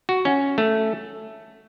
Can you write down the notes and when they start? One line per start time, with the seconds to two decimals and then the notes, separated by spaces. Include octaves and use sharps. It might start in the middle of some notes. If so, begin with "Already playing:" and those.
0.09 F#4
0.25 C#4
0.58 A3